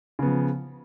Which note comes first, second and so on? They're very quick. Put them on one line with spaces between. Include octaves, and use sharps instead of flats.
C#3 B3 F3